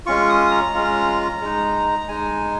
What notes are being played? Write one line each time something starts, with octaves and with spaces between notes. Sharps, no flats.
G#3 C#4 F4 C#6
D#6
A#5
G#3 C#4 F4
G#3 D#4
G#3 D#4 G#5